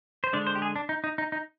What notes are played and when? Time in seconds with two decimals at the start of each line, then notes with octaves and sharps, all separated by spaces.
0.24 C5
0.33 D3 G#3 D4 D5
0.47 C5
0.55 G4
0.62 G#4
0.76 D4
0.89 D#4
1.04 D#4
1.18 D#4
1.32 D#4